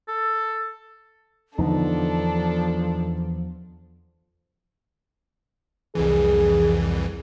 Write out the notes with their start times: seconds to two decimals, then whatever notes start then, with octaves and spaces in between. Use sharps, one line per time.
0.08 A4
1.58 E2 D3 F3 B3 D4 D#4 A4
5.95 C2 F2 E3 G#4